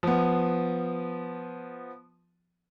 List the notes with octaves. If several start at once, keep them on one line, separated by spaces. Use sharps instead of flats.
F3 B3